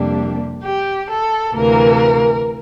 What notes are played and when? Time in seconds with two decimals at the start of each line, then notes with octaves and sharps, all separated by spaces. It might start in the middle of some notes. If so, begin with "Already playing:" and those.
Already playing: F2 C3 G3 A#3 D4
0.64 G4
1.10 A4
1.55 D2 C3 E3 A#3 A#4